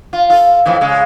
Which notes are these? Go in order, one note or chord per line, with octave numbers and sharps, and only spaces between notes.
F4
F4 A4
F2 A2 E3
C#3 G#3